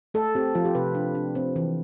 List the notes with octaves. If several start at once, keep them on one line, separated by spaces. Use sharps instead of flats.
A3 A4
C4 G4
F3 F4
G4
C3 B4
D4
D4
C4
E3